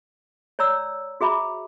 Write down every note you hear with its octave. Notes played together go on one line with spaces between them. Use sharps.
C#5 D5 A#5 E6
F#4 G#4 E5 A#5 B5